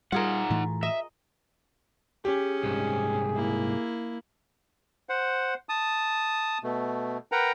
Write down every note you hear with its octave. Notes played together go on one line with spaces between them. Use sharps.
G3 D#4 F4 G#4 A#4 F#5
A2 E3 A3
D#5 E5
C#4 G4 G#4
C2 G#2
A#3 E4
C5 F#5
A5 D#6
B2 A3
A#4 B4 F#5 G5 A#5